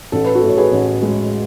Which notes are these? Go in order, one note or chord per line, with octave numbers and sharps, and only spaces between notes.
A1 A4
B4
F#4 A4
A2
C#5
G#4 B4
A1
G#3